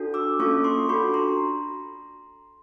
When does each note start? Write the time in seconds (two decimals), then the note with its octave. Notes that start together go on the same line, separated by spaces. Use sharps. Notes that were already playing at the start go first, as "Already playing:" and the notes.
Already playing: D4 F#4 A4
0.14 D6 E6
0.39 A#3 C#4 F4 A4 C#6 D#6
0.64 C6 D6
0.89 D4 F#4 A4 B5 C#6
1.14 A#5 C6